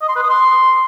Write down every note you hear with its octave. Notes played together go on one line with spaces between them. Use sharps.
D#5
C6
B4
D#6
C6